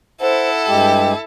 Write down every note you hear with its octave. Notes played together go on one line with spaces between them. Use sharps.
E4 A4 C5 F#5
G2 G#3 G4 G5